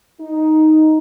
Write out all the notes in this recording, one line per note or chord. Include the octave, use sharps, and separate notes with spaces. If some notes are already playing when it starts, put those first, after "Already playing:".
D#4